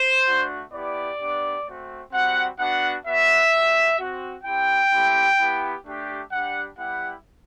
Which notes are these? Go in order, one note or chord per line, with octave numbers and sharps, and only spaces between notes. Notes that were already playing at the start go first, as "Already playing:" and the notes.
Already playing: C5
A3 D4 F#4
B3 E4 G4 D5
B3 D4 G4
A3 C4 F#4
G3 C4 F#4 F#5
B3 D4 F#4 F#5
B3 F#4 E5
G3 B3 F#4
C4 F#4
C4 E4 G4 G5
A3 C4 E4 G4
B3 E4 G4
A3 D4 G4
G3 D4 G4 F#5
G3 B3 E4 G4 F#5